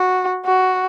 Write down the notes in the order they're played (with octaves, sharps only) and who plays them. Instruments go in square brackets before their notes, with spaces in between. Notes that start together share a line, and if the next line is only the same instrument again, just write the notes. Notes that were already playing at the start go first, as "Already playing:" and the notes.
Already playing: [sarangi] F#4
F#4